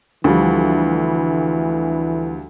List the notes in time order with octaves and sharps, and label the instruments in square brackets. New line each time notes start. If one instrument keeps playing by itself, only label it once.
[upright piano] D2 F3 G3 [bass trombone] E3